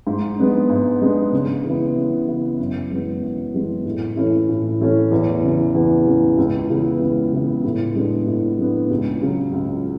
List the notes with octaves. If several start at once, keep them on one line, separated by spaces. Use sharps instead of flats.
G#2
G#3 B3 D4
G#2
G#3 B3 D4
C#3
E3 B3 E4
C#3
E3 B3 E4
F#2
E3 G#3 B3
F#2
E3 G#3 B3
A2
E3 A3 C#4 E4
A2
E3 A3 C#4 E4
E2
C#3 E3
E2
C#3 E3
C#2
C#3 E3 B3 E4
C#2
C#3 E3 B3 E4
A2
G#3 B3 D4
A2
G#3 B3 D4
C#2
C#3 F#3
C#2